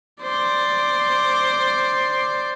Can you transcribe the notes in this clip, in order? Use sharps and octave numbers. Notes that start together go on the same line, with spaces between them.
C5 D5